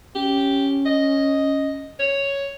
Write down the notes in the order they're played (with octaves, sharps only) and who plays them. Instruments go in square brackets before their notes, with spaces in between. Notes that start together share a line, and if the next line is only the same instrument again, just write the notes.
[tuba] C#4 [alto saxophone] G4
[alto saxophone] D#5
C#5